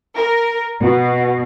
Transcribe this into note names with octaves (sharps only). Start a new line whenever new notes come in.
A#4
B2